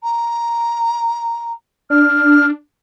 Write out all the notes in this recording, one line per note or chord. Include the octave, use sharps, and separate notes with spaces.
A#5
D4 F6